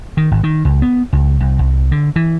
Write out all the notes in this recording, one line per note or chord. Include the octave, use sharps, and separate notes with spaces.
D#3
G#1
D#3
C#2
B3
C#2
C2
C2
D3
E3